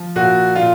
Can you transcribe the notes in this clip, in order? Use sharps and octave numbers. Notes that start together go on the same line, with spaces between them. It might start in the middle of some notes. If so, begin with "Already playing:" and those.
Already playing: F3
A#2 F#4
A#2 F4